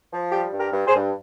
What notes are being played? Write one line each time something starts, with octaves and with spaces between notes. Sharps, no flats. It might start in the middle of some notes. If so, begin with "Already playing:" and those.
F3
G3 G4
G2
G4 A#4
G2
G#4 C5
G2